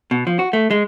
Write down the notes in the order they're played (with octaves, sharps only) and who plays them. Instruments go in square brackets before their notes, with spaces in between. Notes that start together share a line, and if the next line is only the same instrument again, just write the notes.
[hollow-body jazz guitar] B2
F3
F#4
A3
G#3